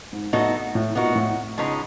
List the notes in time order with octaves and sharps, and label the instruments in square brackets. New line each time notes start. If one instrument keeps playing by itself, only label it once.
[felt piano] G#2
[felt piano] A2 [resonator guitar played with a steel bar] F#3 B3 D#4 F#4 A4
[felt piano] A2
[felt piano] A#2 [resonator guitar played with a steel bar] B3 D#4 F#4 A#4
[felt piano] A2
[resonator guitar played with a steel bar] C#3 F3 G#3 B3 D#4